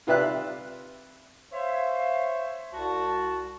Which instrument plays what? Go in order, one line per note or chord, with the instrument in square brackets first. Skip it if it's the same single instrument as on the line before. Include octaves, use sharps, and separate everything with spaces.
[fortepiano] C3 F4 B4 D5 E5 F#6
[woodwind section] C5 C#5 E5 [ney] F5
[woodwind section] C2 F#4 [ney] A5